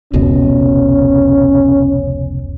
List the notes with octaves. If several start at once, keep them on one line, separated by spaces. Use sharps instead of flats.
F1 C#2 B2 C#4